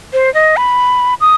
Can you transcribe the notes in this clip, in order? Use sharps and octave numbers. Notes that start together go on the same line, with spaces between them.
C5
D#5
B5
D#6